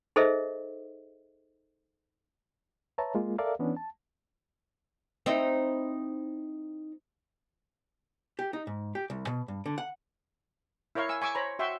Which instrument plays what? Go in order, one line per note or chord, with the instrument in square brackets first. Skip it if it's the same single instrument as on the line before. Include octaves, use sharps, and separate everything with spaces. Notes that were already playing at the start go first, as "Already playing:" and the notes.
[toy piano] D#4 G#4 A4 C5 D#5 E5
[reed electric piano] B4 C#5 E5 A5 A#5
G#3 A#3 F4
A4 A#4 D5 E5 F5
E3 B3 C#4 D4
A5
[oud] C4 D#4 E4
[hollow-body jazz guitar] G4
D#4
G#2
G4
C2
B2
G2
D3
F#5
[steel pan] E4 A#4 C#5 F5 C#6
G#5 E6
G#5 C#6 D6 E6
C5 C#5 A#5 B5
F#4 E5 G5 C6 C#6